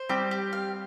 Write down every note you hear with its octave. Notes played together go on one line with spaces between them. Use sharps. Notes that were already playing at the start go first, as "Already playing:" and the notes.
Already playing: C5
G3 C4 G4
G4
F5